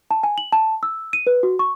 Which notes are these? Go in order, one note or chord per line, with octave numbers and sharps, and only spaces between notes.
A5
G#5
F#7
A5
E6
D#7
B4
F#4
C#6